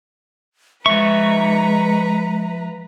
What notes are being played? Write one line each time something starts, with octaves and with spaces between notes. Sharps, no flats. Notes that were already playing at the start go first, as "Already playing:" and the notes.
F3 G#3 B4 E5 A#5 C#6